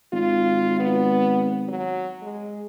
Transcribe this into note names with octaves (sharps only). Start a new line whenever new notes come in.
G#1 F4
B3
F#3
G#3